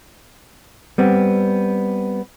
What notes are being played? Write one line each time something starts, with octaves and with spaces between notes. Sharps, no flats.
G3 B3 C4